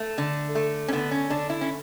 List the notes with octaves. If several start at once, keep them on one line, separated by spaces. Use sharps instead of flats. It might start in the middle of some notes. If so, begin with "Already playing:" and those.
Already playing: A3
D3
A3
C#4
D3 B3
C#4
D3 D4
E4
C#4